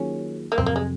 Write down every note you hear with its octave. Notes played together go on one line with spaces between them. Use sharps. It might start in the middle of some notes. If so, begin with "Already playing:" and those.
Already playing: D#3 F#3 A#3 C#4 F4 G#4
A#3
F2 C3 F#3 C4
A#3
G#3